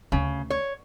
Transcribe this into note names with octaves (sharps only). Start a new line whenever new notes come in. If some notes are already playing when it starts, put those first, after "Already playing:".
D2 C#3 C#4
C#5